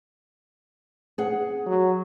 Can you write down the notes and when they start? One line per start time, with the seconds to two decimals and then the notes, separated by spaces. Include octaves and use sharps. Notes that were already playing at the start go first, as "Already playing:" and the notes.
1.18 G#4 F#5
1.66 F#3